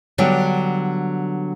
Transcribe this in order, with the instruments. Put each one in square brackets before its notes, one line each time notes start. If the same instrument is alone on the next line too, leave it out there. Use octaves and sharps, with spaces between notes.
[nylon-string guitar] D3 F#3 G3 B3